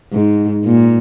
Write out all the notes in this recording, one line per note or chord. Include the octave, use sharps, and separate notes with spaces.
G#2
A#2